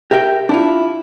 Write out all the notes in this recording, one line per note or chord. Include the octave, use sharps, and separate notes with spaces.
G4 A#4 E5 F#5 G5
D4 E4 F4